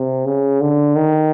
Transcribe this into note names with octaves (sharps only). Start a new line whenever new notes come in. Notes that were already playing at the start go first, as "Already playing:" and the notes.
Already playing: C3
C#3
D3
D#3